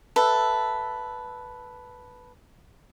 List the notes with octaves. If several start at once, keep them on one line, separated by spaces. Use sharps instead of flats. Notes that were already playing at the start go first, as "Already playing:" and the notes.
A4 B4 E5